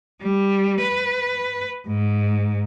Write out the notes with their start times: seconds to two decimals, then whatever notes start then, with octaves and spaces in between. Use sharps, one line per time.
0.22 G3
0.81 B4
1.87 G#2